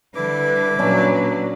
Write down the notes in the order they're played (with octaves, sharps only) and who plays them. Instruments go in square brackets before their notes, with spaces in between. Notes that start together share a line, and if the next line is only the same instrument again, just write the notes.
[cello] D3 G3 [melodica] E4 D6 [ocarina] B4
[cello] A#2 F#3 [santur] C#4 D4 E6